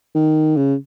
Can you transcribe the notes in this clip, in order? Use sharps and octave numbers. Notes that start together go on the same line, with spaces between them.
D#3
C#3